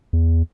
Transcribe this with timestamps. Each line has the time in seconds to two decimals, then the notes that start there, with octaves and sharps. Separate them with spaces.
0.13 E2